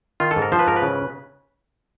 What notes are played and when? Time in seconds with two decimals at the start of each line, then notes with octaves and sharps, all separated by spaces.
0.20 D#3 F4
0.31 A4
0.36 G#2
0.42 A#4
0.52 F3 C5
0.59 B4
0.67 G#2 A#4
0.76 B4
0.82 C#3